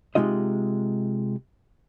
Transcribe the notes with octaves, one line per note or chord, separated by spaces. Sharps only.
C3 G#3 D#4 F4 D#5